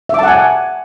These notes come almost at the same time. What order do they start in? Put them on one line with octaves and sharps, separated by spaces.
E5 D6 A5 F#5 G#5